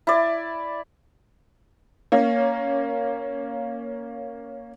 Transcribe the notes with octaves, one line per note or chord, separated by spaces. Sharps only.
E4 D5
A#3 C#4